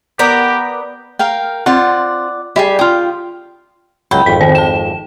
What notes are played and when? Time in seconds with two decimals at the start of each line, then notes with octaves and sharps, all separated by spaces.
0.19 B3 G4 A#4 D5
1.19 A#4 F5 G5
1.66 C4 F4 D5 F#5
2.56 G3 E4 G4 G#4
2.79 F4 G5 D#6
4.11 C#2 F#3 G5 B5
4.26 G#1 F2 B6
4.41 D#3 C5
4.55 A5 E7